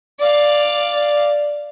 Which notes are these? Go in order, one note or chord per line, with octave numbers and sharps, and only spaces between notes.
D5 F5